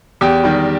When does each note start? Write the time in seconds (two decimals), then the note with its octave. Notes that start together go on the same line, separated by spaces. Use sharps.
0.21 E2 G4
0.44 D#3 G3